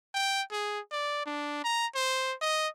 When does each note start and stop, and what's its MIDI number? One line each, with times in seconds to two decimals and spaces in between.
0.15 0.42 79
0.52 0.80 68
0.92 1.24 74
1.26 1.61 62
1.64 1.87 82
1.95 2.34 72
2.42 2.68 75